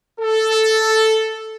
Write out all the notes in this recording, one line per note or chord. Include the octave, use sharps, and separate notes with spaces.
A4